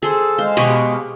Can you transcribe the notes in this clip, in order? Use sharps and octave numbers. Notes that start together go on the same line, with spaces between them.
G#4 A4 C5
G#3 C5 F5
B2 G4 G#4 C#6